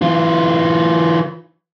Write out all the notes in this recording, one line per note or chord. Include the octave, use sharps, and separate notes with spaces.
E3 F4